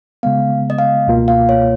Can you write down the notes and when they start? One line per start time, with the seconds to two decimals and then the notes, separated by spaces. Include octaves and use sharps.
0.23 C#3 G#3 B3 F5
0.70 D#5
0.78 F5
1.07 C#2 B2 A#3 F4
1.28 F5
1.49 C#5